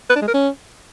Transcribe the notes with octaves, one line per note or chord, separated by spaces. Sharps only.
B4
D4
G#3
A#4
C#4